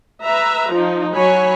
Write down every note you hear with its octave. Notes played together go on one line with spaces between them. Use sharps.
B4 E5 A#5
F3 D#4
F#3 C#5 G#5 B5